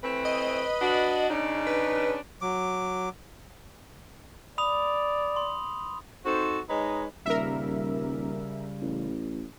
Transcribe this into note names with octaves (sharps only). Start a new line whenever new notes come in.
E3 A3 C4 B4
D#5
D4 F#4
C#3 D4 D#4
B4
F#3 D6
D5 B5 D#6 F7
C6
C4 D#4 F#4 A4 C5
G#3 D#4 B4 C#5 D#5 A#5
D#1 C#3 G3 A#4 E5
A1